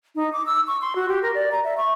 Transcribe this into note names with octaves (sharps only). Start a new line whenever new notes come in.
D#4
D6
E6
C#6
C6
F#4
G4
A#4
D5
A#5
E5
C#6